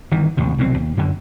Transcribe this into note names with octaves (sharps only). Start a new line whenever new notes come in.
G1 D#3 E3
A1 D#2 C3
C2 B2 F#3 C4
D#2
F#2 D3